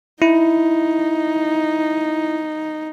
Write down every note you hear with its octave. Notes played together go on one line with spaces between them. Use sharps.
D#4 E4